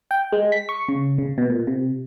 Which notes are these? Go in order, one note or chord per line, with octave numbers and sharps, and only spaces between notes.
G5
G#3
B6
C#6
C#3
C#3
B2
A#2
C3